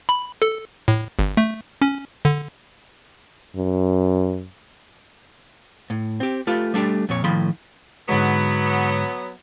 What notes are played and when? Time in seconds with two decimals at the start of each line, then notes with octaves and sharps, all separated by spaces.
0.09 B5
0.42 A4
0.88 A2
1.19 G1
1.37 A3
1.82 C#4
2.25 D3
3.56 F#2
5.90 A2
6.20 C4 G4
6.47 A3 F4 G4 B4
6.74 G3 A3 D4 G4
7.09 F2 A#2 C#5
7.24 A2 D#3 F3 B5 C6
8.09 G#2 D3 F#3 G#3 B3